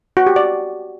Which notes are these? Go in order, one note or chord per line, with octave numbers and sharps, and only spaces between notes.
F#4
G4
D5